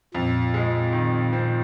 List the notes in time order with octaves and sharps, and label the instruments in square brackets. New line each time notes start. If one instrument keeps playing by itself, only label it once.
[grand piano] F2 [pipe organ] A#2
[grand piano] G#3
D#3
C4